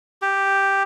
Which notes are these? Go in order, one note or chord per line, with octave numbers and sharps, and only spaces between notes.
G4